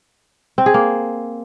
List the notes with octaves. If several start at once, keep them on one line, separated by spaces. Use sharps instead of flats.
C4
G#4
A#3